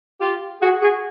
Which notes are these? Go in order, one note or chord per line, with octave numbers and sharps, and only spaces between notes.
F4 G4
F#4 G#4
F#4 G#4